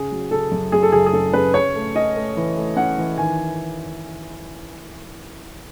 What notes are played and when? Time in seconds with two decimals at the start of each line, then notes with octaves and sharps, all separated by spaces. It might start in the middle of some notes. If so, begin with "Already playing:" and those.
Already playing: C#3 G#4
0.12 F#3
0.31 C#3 A4
0.51 F#2
0.72 F#2 G#4
0.83 A4
0.92 F#1 G#4
1.06 G#4
1.13 C#3 A4
1.33 C#3 B4
1.54 C#4 C#5
1.75 A3
1.95 C#4 D#5
2.16 A3
2.37 E3
2.57 A3
2.76 C#4 F#5
2.98 E3
3.18 D#3 G#5